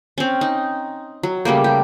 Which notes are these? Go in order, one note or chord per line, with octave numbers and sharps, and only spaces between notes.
C4 C#4
D#4
F#3
C#3 G3 A3 A#3
G4